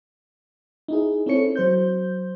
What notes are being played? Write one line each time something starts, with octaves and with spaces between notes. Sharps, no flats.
D#4 E4 G#4
C4 E4 A4 C#5 C#7
F#3 C5 G6